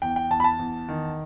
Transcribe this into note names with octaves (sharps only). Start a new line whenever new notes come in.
E2 G5
G5
E2 A5
B5
A5
E2
D#3